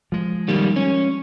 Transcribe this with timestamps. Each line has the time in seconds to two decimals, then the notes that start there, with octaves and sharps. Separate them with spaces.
0.12 F3 G#3
0.48 D#3 G3 A#3
0.76 C#4